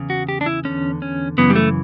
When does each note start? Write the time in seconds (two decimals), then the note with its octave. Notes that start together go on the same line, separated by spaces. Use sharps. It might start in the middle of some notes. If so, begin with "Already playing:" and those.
Already playing: E2 C#3
0.10 F#4
0.29 G4
0.41 D4
0.46 E4
0.65 E2 D3 C#4
1.02 C#4
1.38 F#2 C#3 E3 B3
1.50 G3
1.56 A3